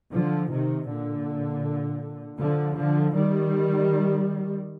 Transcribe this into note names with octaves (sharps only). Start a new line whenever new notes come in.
D3 F3
C3 D#3
A#2 D3
D3 F3
D3 F3
D#3 G3